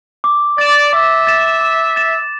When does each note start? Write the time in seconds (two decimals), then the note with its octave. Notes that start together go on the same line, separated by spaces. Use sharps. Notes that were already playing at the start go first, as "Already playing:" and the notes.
0.24 D6
0.58 D5 A6 E7
0.93 E5 D6
1.27 A6 E7
1.61 D6
1.96 A6 E7